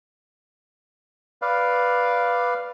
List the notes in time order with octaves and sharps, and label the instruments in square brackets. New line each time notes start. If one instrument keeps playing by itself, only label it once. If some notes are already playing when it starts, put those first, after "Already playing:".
[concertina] B4 D5 F5